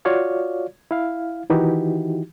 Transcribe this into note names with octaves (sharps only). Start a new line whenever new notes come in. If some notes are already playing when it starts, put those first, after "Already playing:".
F4 F#4 C#5 D5 F5
E4 F5
D#3 E3 D#4 E4 F#4 G4